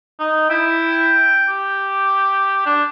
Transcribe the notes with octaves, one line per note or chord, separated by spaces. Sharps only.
D#4
E4 G5
G4
D4